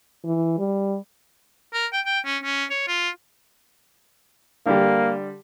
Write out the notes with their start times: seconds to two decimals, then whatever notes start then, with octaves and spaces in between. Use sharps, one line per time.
0.25 E3
0.59 G3
1.73 A#4
1.93 G5
2.06 G5
2.25 C#4
2.43 C#4
2.70 C#5
2.87 F4
4.66 D3 G3 A#3 G4